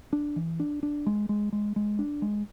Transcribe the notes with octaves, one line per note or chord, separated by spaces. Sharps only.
D4
E3
D4
D4
G#3
G#3
G#3
G#3
D4
G#3